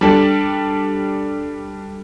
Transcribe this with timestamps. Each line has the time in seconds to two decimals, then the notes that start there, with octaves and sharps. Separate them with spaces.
0.01 G3 D4 A4